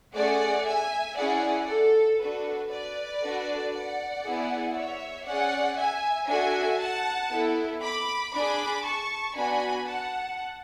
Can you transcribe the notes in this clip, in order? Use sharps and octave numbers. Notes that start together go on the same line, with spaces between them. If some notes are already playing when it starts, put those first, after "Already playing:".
A3 C#4 G#4 D5 F#5
E5 G#5
C#4 E4 G#4 D5 F#5
A4
D4 F#4 A4 B4
B4 D5
D4 F#4 A4
D5 F#5
B3 E4 G#4
C#5 E5
C#4 G#4 D5 F#5
E5 G#5
D4 F#4 A4 E5 G#5
F#5 A5
B3 E4 A4
B5 D6
D4 G#4 B5 D6
A5 C#6
B3 D4 F#4 G#5 B5
F#5 A5